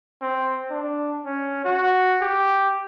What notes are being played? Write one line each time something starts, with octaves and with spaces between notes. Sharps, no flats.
C4
D4
C#4
F#4
G4